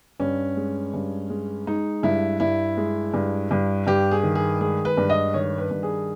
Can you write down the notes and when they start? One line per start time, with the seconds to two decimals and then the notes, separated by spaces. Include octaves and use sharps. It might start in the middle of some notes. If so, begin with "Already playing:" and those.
0.20 G2 C#4
0.57 G#3
0.94 G2
1.30 G#3
1.67 G#3 D#4
2.03 G2 E4
2.40 G2 E4
2.77 G#3
3.14 G2
3.51 G2
3.87 G2 G4
4.11 G#4
4.23 D#3
4.35 G#4
4.61 G#3 G#4
4.85 B4
4.97 G2
5.10 D#5
5.34 D#3 C#5
5.58 B4
5.71 G2
5.83 G#4